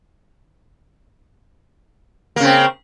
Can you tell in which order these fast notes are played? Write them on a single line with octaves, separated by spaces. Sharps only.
A#3 C#3 C4